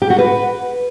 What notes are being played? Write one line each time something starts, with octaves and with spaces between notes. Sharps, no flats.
G4
F#4
B4